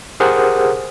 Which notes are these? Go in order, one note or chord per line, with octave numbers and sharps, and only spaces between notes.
G4 G#4 A#4 C5 F#5